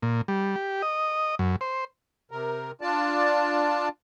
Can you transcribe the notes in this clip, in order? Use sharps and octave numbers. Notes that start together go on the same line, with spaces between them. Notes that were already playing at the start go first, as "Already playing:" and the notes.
A#2
G3
G4
D#5
F#2
C5
C3 A#4
D4 F4 D5 A5